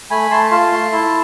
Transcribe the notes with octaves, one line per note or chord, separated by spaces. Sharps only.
A3 G#5 B5
A3 A5 C6
F4 A5 C6
A3
E4